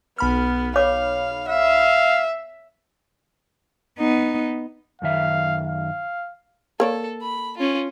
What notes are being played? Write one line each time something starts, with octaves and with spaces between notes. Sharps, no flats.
B1 B3 B5 F6
C#5 F5 D6
E5 F5
B3 D#4
F#2 D#3 E5 F5
F5
A#3 A4 C#5 D5
B5
C#4 F4